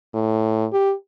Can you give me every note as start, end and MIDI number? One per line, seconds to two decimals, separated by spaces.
0.14 0.65 45
0.72 0.93 67